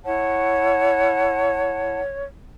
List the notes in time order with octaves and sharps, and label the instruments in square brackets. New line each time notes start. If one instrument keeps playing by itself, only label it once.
[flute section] E4 F#5 A5 [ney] C#5